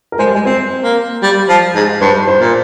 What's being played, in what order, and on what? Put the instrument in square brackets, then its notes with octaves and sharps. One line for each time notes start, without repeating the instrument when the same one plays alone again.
[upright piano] A#4
[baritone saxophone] G#3 [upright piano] C5
[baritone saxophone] G3
G#3
[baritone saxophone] C4 [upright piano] C5
[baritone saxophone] A#3
G3
F3
G#2
[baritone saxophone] G2 [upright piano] C5
[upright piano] C5
[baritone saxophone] A#2